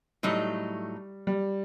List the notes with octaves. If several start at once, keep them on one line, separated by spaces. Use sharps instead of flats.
A2 F#3 G3 A3 D#4
G3